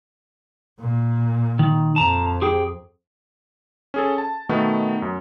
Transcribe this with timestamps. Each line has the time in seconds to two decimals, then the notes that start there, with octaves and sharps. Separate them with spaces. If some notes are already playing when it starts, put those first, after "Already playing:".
0.81 A#2
1.59 D#3
1.96 F2 A5 A#5
2.42 G4 G#4 G5
3.94 C#4 G#4 A4
4.18 A5
4.49 B2 D#3 A3 B3
5.02 F#2